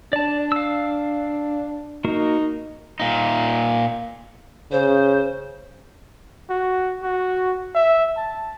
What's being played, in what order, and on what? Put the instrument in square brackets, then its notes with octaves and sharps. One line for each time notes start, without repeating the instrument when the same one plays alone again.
[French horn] D4 [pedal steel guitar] D5 A5
[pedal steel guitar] F5 E6
[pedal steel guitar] A#3 F#4 A#4 [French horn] D#4
[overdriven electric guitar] A#2 D#4
[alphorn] C#3 [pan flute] C5
[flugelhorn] F#4
F#4
E5
A5